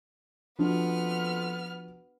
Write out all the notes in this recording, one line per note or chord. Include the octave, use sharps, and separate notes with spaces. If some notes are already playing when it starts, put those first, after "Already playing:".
F2 F3 B3 D4 F#4 F6